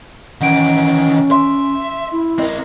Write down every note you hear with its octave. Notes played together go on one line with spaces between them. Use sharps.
D#3 E3 C#4 F#5 D7
E5 C6
E4
C4 A#4 D#5